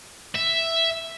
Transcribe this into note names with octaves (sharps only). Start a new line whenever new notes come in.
E5